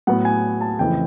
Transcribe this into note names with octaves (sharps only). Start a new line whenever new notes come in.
A2 F#3 B3 F#5
G#5
A5
F2 C#3 E3 A3 G5